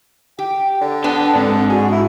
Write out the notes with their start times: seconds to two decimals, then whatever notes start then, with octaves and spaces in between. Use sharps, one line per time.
0.39 G4 G5
0.81 D3
1.04 B3 D4 G4 A5
1.35 G#2 D3 C4
1.70 F#4 G#4
1.93 E4